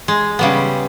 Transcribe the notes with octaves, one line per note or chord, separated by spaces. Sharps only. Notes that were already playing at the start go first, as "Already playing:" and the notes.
G#3
C#3 G3 B3